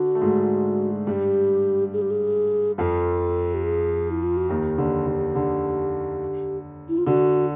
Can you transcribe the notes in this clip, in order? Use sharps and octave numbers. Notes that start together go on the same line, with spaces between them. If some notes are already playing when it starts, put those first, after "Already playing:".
Already playing: D3 D4 F#4
A3
G#2 G#3
G2 G3 G4
G#4
G4
G#4
F2 F3 A4
G4
G#4
E4
F4
F#4
D#2 D#3 G4
D3
D3
D3
E4
F4
D3 F#4